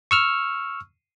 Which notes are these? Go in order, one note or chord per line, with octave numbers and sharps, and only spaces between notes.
C#6 E6 F6